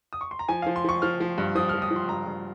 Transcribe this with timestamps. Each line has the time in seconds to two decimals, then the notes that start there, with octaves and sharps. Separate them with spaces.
0.13 D#6
0.21 C#6
0.31 C6
0.39 A#5
0.49 F3 G#5
0.62 F3 F5
0.76 C6
0.85 F3 C#6
1.02 F3 F6
1.20 F3
1.38 G2
1.55 F3 D#6
1.69 F3 F6
1.82 D#6
1.91 F3
1.96 C6
2.09 G2 A#5
2.27 G2